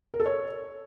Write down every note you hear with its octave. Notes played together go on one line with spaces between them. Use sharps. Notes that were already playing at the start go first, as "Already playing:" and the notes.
A#4
A4
C#5